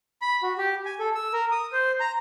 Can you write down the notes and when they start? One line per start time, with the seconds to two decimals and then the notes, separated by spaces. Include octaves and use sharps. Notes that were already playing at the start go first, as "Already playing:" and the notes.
0.22 B5
0.43 F#4
0.58 G4
0.85 G#5
1.00 A4
1.15 E6
1.33 A#4
1.51 D#6
1.72 C5
2.00 A#5